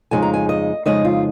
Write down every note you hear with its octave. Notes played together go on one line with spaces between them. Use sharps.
F2 C#3 G#3 D#4 G#5
A#5
G#5
D#5
F2 C#3 G#3 D#4 D#5
F4